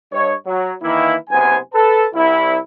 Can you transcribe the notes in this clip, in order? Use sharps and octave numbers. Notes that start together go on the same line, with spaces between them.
G2 C#5 D#5
F#3
D#3 E3 A#3 E4
F#1 C3 B3 C5 G#5
A4 B4 A5
C2 E4